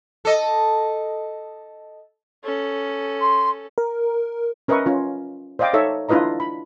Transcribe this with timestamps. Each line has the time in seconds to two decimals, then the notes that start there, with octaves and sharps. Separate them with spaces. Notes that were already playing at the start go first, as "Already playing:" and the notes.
0.25 A4 D#5
2.44 C#4 A4
3.21 C6
3.78 A#4
4.68 C#4 A#4 B4 D#5 E5 C#6
4.86 C#4 F4
5.59 C5 D5 D#5 F5 G5 D6
5.73 D#4 A4 C#5 E5
6.09 D4 E4 F4 B4 D#5 A#5
6.40 B5